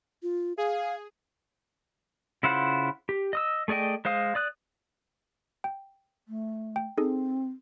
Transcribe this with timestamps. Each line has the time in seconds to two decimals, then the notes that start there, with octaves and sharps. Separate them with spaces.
0.23 F4
0.58 G#4 F5
2.43 C#3 E4 F4 C5 F#5
3.09 G4
3.33 D#5 D#6 E6
3.68 A3 G#4 D5 D#5 G5
4.05 G#3 C5 F5 D#6
4.35 D5 D#6 F#6
5.64 G5
6.28 A3
6.76 G5
6.98 C4 D#4 G#4 A4